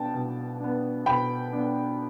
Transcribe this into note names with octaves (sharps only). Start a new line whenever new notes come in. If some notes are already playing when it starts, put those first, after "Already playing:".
Already playing: B2 B3 D4 G5 A5
B2
B3 D4
B2 G5 B5
B3 D4